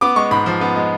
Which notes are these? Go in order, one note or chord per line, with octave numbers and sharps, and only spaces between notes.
B3 D6
G#3 C#6
G#2 B5
F3
B3
G#3